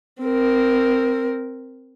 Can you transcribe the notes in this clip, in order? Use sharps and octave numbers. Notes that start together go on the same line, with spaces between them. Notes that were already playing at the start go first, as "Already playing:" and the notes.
C4 A#4